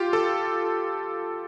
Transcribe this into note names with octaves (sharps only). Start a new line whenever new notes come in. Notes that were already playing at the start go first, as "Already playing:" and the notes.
Already playing: F4 G4
A4